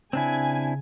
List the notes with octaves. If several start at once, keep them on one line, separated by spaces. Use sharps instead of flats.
C#3 C4 D4 E4 G#5